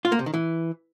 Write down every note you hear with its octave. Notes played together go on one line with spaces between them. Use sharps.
F4
A#3
C3
D#3
E3